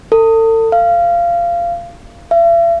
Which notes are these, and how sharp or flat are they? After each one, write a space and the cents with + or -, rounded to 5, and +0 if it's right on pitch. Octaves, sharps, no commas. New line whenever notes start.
A4 +40
F5 -20
E5 +45